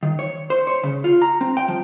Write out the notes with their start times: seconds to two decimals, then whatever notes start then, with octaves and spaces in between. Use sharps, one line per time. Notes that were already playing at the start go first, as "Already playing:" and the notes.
0.03 D#3
0.19 C#5
0.50 C5
0.67 C#5
0.83 C#3
1.04 F4
1.22 A#5
1.41 C4
1.57 G5
1.68 F3